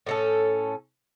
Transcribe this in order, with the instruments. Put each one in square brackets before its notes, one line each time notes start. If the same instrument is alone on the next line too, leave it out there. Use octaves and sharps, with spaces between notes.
[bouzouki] A2 C#4 A4